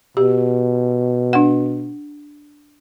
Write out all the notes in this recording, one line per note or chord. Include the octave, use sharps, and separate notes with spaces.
B2 G4
D4 F#5